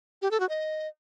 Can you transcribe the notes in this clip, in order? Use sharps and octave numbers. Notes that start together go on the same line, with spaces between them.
G4
A4
F#4
D#5